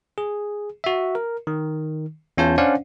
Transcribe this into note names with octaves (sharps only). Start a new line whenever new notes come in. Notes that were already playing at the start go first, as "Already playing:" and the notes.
G#4
F#4 E5
A#4
D#3
E2 C#4 F4 C#5 A5 G6
C#4 D4 C5 D5 F5 F#5